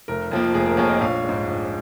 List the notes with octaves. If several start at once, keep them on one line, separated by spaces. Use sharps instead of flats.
F1 A#4
F2 F3 A#3
F1 G#4
A#4
F2 F3 A#3 G#4 C#5
A#4 D#5
A#1 C#5 F5
G#2 G#3
A#1